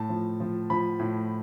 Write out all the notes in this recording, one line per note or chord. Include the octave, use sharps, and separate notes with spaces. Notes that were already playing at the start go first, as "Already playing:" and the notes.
Already playing: A2 A5
F3
F3
F3 B5
A2